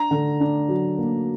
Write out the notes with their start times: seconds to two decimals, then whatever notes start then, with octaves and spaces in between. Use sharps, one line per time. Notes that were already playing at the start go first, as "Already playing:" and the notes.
Already playing: D4 A#5
0.11 D3
0.40 D4
0.69 F#3
0.99 A#3